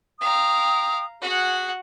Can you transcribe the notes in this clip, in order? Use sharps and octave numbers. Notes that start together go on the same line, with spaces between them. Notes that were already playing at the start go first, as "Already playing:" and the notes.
F5 G5 A#5 D#6
F#4 G#4 F#5